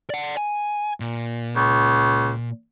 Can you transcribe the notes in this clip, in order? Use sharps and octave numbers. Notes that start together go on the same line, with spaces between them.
D5 F#5
G#5
A#2
C#2